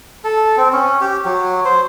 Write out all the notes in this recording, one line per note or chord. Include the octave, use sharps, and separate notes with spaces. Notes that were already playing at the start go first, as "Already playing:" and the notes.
A4
C4
C#4
G4
F#3
C5